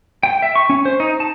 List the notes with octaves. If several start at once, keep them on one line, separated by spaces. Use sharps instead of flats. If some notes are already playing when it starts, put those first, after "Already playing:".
G5
E5
C#6
C#4
C5
D#4
A5